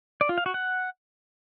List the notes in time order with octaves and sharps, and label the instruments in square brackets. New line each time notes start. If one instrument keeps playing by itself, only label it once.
[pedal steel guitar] D5
F4
F5
F#4
F#5